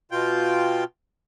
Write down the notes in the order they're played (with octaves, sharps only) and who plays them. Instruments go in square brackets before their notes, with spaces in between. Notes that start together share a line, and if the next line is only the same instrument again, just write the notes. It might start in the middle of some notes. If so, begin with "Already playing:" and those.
[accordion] B2 F4 G5